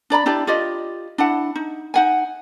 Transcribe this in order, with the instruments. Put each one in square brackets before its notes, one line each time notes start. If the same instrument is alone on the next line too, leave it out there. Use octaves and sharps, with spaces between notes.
[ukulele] D4 D5 A#5 B5
D4 E4 G4 D5
F4 G4 D5 D#5
D4 E4 F#5
D#4
D#4 F#5 G#5